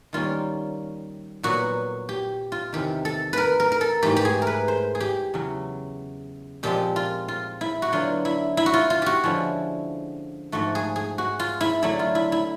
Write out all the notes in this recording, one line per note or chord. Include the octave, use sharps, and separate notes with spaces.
D#3 G3 A#3 C#4 F4
A#2 F#3 B3 F#4
G4
F4
E2 C3 D#3 G4
A4
A#4 B4
A#4
A#4
A4
G#2 E3 A3 G4
G4
G#4
A#4
B4
C5
G#4
G4
E2 C#3 F#3
A#2 F3 G#3 C4 G4
F4
F4
E4
F#4
D3 F#3 B3 D4 F4
E4
E4
F#4
F4
F4
F#4 G4
D3 F3 G#3 C#4 E4
G#2 F3 A3 F#4
G#4
G#4
F#4
F4
E4
D3 F#3 A3 D4 E4
F4
E4
E4